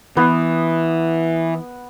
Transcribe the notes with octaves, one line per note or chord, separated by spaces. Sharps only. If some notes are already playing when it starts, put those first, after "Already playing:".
E3 B3